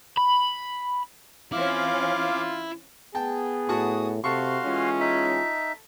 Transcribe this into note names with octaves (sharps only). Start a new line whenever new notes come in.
B5
E3 C4 C#4 E4 F4 F5 D6
B3 G#4 G5 A5
A2 F#4 A5 C#6 D#6
C3 F#4 A4 F5 C6 C#6
E3 G#3 C#4 F4
D#4 E5